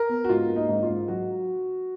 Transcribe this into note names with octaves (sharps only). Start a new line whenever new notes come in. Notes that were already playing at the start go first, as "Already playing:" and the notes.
Already playing: A#4
B3
F#4
G#2 F4
A#3
D#4
G#2
F4
G#2
F#3 F#4